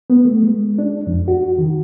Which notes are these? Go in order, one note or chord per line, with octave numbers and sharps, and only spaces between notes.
B3
A3
G#3
D4
F2
F#4
D#3